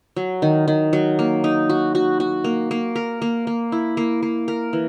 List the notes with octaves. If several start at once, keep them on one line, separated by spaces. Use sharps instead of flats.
F#3
D#3
D#3
F#3
A#3
D#4
F#4
F#4
F#4
A#3
A#3
A#4
A#3
A#3
E4
A#3
A#3
A#4
E3